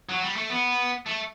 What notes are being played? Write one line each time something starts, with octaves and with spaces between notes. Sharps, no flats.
F#3
G3
A3
B3
A3